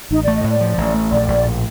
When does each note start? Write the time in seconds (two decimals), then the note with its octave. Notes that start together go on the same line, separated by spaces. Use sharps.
0.11 A1 D#4
0.23 D5
0.28 A3
0.36 D#5
0.44 A2 D5
0.61 F3
0.78 A1
0.94 A3
1.11 A#1 D5
1.28 A#1
1.45 A2